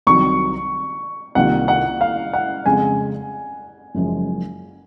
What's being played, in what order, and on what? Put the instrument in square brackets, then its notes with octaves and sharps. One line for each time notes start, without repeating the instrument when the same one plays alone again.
[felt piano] C2 C3 D#3 F#3 [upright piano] C#6
[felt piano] C2 C3 D#3 A#3 F4 [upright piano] F#5
[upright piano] F#5
F5
F#5
[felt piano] F2 C#3 G#3 [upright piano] G#5
[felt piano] F#1 F#2 F3 G#3